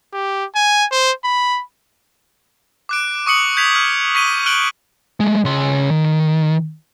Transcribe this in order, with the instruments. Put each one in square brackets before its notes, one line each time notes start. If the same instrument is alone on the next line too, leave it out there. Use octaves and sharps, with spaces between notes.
[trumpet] G4
G#5
C5
B5
[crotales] D6 F#6 D7
C#6 D#6 C#7 F#7
G6 G#6 B6 F7
F6
C#6 B6 D#7 G7
F6 F#6 D7 F#7 G7
[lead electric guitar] G#3 A3
C#3 C6
D#3